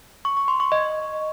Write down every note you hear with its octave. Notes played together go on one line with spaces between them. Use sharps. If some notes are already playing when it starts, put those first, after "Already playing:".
C#6
C#6
C6
C#6
D#5